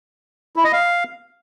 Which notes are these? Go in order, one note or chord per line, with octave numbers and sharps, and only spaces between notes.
E4
D#5
F5